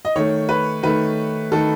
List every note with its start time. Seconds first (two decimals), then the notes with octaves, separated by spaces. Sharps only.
0.05 D#5
0.16 D#3 A3 C#5
0.49 B4
0.83 D#3 A3 B4
1.52 D#3 A3 A4